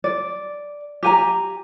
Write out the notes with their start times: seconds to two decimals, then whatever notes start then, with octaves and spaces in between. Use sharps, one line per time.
0.04 D5
1.03 G4 G#5 A#5